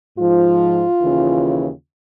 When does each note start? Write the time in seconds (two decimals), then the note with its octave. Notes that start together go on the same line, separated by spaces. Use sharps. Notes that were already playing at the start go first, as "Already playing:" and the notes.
0.18 G#2 F3 F4
1.02 D#2 C#3 E3